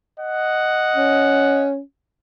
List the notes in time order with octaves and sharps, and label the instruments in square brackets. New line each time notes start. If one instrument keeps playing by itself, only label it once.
[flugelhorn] D#5 [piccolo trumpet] F#5
[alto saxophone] C#4